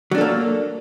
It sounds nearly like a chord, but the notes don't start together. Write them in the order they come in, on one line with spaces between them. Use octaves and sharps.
F#3 D4 A4 A#3